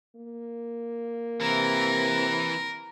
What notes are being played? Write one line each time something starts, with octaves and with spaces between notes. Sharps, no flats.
A#3
C3 E3 A#4